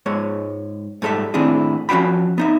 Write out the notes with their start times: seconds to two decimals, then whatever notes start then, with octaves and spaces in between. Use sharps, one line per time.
0.06 G#2 G#3 C#5
1.02 G#2 G3 A4 B4 E5
1.34 A2 D#3 C4 D4 E4 G#4
1.89 F3 C#4 F#4 F5 G5 B5
2.38 B3 D#4 E5